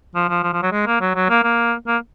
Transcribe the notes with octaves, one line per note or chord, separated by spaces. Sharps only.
F3
F3
F3
F3
F#3
G#3
A#3
F#3
F#3
A#3
A#3
A#3